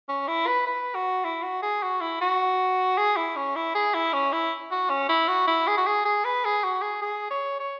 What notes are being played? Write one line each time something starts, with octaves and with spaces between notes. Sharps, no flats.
C#4
E4
B4
B4
F#4
E4
F#4
G#4
F#4
E4
F#4
G#4
E4
C#4
E4
G#4
E4
C#4
E4
F#4
C#4
E4
F#4
E4
G#4
F#4
G#4
G#4
B4
G#4
F#4
G#4
G#4
C#5
C#5